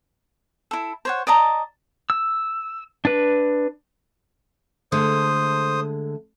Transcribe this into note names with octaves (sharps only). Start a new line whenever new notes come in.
E4 A4
C5 C#5 F#5
D5 D#5 A5 A#5
E6
D4 B4
D3 G#3 A3 C5 D#6